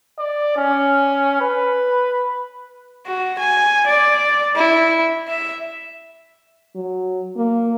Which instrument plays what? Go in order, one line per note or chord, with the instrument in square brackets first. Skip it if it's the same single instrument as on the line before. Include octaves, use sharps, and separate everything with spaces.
[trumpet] D5
C#4
B4
[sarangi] F#4
G#5
D5
E4
E5
[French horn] F#3
A#3